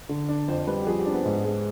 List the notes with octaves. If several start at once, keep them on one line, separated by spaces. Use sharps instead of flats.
D3
D4
F2 C5
G3 B4
G4
F3 G#4
G4
C4 D4
B3
G#2
G#3